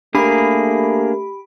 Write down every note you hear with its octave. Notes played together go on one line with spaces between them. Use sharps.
A3 A#3 D4 G4 G#4 A#4 B5